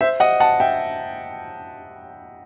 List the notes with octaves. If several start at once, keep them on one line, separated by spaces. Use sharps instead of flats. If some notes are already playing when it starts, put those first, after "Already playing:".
C5 E5
D#5 F#5
F#5 A5
E5 G5